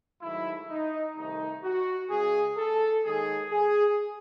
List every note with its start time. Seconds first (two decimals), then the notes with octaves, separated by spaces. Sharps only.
0.22 G#2 D#3 F#3 A3 E4
0.70 D#4
1.16 C2 C3 D#3 A3 D#4
1.64 F#4
2.10 C#2 C#3 G#3 G#4
2.57 A4
3.06 D#2 D#3 G#3 G#4
3.52 G#4